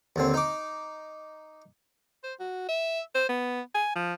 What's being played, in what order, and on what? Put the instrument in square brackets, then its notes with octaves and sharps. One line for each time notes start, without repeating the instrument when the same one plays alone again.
[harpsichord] D#2 D3 C4
D#4 D6
[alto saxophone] C5
F#4
E5
C5
B3
G#5
F3